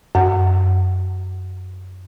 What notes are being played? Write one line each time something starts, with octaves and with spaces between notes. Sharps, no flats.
F#2 F#5